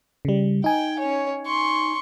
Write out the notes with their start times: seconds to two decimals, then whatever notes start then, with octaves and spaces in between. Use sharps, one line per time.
0.25 C#3 G3
0.64 D#4 G5 G#5
0.99 C#4 C#5
1.46 C6 C#6